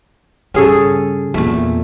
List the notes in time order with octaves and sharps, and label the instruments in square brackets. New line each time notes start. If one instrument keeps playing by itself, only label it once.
[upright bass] G2 C#3 [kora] C#4 G#4 A4
[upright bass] E2 A#2 [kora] A3